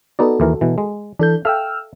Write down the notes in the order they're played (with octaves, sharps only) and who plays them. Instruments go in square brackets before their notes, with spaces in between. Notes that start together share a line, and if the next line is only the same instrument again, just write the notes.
[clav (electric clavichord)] B3 D#4 D5 [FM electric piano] F#4 A4
[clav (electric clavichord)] D#2 E3 A#4
B2 E3
G#3
[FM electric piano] E3 A4 G6 [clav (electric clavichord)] D4
[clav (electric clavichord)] A4 E5 F5 [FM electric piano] G5 E6 F6